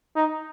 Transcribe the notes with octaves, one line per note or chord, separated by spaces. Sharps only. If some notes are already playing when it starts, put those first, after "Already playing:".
D#4